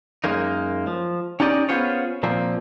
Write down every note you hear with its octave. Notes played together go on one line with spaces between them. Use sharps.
F#2 G#3 A#3 D#4
F3
C#4 D#4 G4 D5 D#5
B3 C#4 F4 G#4 C5 C#5
A#2 F3 A#3 C4